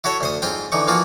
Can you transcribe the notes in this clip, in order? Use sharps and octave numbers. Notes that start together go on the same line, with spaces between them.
E4 F#4 A4 C#5 E5
D2 C5 D#6
G#2 C4 F4 G5
D3 E3 D#4 C#6
E3 F3 A#3 F4 F#4